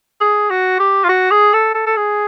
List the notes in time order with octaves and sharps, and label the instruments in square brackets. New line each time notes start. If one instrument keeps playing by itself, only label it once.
[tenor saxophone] G#4
F#4
G4
F4
F#4
G#4
A4
A4
A4
G#4